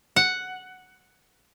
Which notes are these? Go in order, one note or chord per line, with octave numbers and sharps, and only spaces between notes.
F#5